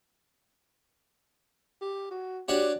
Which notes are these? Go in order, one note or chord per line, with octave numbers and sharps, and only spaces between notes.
G4
F#4
D4 F#4 G4 C#5